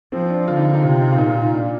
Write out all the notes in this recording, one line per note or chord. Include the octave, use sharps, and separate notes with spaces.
F3 C4
D4
D3 F4
D#4
F4
D#4
C3 F4
D#4
F4
A#2 D#4
F4
D#4
D4